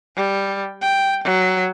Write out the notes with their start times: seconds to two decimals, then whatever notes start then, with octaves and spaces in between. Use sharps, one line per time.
0.17 G3
0.82 G5
1.24 F#3